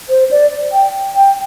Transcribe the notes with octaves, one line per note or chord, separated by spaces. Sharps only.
C5
D5
G5
G5